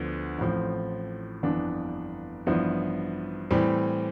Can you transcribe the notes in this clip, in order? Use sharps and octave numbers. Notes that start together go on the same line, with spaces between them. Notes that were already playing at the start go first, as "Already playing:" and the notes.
Already playing: D2 D3 F3 B3
A1 A2 F3 C4
G1 F2 E3 B3 D4
A1 G2 F3 B3 E4
A2 E3 G3 C4